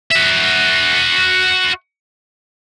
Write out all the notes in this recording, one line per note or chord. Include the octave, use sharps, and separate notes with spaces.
F#4 E5